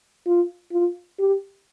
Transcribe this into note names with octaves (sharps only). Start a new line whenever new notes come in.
F4
F4
G4